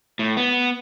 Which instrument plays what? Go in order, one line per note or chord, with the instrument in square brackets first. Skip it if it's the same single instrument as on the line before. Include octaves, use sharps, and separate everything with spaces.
[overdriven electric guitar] A2
B3